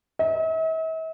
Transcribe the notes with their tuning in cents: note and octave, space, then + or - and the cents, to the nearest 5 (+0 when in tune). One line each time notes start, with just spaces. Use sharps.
E5 -45